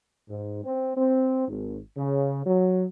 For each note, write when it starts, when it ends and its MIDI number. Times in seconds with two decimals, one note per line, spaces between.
0.28 0.62 44
0.64 0.95 60
0.97 1.47 60
1.48 1.78 32
1.97 2.44 49
2.45 2.84 54